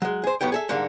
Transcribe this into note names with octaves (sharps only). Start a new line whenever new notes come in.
F#3 G#3
G#4 C5
A2 F#3 B3 G4 G5
G#4 A4 E5
G#2 D3 G3 A#3